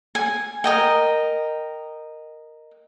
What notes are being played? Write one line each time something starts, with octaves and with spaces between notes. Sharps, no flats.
G#5
A#4 D#5 G5